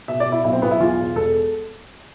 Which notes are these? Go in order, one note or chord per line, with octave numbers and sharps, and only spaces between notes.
B2 E5
D5
B2
E4
B1 E4
C4
B1 B3
E4
E2 F4
E1
E1 A4